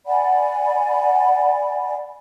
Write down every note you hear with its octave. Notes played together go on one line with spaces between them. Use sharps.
D5 F#5 G#5 B5